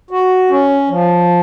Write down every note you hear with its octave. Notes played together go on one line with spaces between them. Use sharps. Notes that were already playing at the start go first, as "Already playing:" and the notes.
F#4
C#4
F3